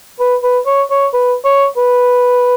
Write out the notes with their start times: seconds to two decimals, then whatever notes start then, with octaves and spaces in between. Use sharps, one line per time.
0.20 B4
0.43 B4
0.66 C#5
0.91 C#5
1.13 B4
1.44 C#5
1.77 B4